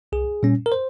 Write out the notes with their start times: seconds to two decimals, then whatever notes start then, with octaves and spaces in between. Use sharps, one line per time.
0.12 C2 G#4
0.43 A#2 G3 C#4
0.66 A#4
0.72 C5